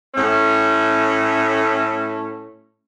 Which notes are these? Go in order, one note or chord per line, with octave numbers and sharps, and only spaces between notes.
A2 A3 C#4